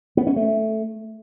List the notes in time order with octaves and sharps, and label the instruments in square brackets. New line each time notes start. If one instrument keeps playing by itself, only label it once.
[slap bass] B3
C#4
A3